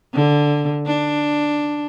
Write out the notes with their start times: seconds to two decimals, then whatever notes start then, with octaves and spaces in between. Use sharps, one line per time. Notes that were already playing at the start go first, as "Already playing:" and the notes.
0.14 D3
0.87 D4